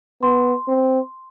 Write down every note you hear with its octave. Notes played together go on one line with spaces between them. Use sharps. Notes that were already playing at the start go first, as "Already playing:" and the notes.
B3 C6
C4